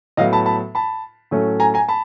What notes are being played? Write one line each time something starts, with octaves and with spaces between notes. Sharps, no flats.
A2 F#3 B3 D#5 F5
A5 B5
A5 B5
A5 B5
A2 F#3 A3 C#4
G#5 A#5
G#5 A#5
A5 B5